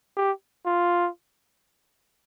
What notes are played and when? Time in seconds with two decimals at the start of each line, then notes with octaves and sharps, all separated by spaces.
0.17 G4
0.65 F4